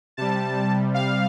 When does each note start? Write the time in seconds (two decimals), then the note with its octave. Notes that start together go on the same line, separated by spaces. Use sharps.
0.17 C3 G3 A5
0.94 F5